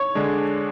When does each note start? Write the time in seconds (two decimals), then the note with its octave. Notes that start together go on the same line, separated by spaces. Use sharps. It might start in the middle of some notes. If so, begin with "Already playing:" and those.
Already playing: C#5
0.15 D3 G#3 D4